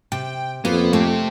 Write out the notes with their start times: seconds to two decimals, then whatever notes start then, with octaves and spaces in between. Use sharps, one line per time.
0.12 C3 G5
0.65 F2 A#3 B3 C5
0.93 A3 C4 G4